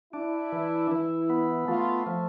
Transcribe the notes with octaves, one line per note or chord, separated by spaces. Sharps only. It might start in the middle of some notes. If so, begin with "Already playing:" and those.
D4 E4
E3
E3
B3
A3 F4
F3